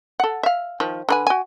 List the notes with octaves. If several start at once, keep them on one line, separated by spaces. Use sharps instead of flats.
A4 F#5
E5 F5
D#3 F3
D3 B4 G#5
F#4 G#5